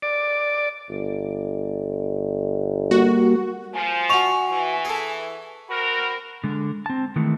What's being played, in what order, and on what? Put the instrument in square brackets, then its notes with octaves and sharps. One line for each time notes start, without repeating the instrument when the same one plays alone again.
[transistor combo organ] D5
[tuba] G1
[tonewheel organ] G3 A#3 [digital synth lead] F#4
[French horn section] F3 [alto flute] G#5
[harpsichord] F#4 D#5 [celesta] C#6 F7
[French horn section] E3
[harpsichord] G#4 A4
[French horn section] C4 F#4 A#4 [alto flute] B5
[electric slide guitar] D3 G#3
C4 A5
D#3 E3 G#3 A3